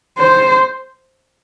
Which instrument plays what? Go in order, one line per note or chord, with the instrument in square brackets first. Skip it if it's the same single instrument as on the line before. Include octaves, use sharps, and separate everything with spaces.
[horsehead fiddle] C5